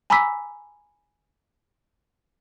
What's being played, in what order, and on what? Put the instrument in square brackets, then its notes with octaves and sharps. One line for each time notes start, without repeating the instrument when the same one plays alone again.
[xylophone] G#5 A#5 B5 D6 E6 B6